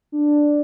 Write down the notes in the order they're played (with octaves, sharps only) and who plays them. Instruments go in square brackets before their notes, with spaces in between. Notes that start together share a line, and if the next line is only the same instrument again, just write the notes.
[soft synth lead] D4